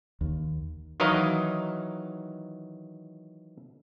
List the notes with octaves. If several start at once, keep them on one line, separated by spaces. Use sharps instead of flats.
D#2
D#3 E3 F#3 D#5 F5 A#5